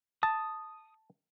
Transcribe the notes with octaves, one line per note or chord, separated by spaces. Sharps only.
A5 D#6